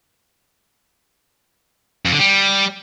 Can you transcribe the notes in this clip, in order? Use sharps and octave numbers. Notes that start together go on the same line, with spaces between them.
F2
D3
G3